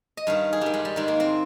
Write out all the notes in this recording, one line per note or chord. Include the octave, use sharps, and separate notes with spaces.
D#5
G2 D#3 F5
G#4
G2 D#3 G4
G#3
G3
G#2 D#3 G#3
A#3
C4